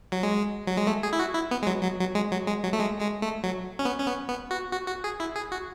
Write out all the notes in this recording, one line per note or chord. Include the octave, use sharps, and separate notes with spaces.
F#3
G#3
F#3
G#3
A3
G#4
E4
F#4
E4
B3
G#3
F#3
F#3
F#3
G#3
F#3
G#3
F#3
A3
G#3
G#3
A3
F#3
C#4
B3
C#4
B3
B3
F#4
F#4
F#4
G#4
E4
G#4
F#4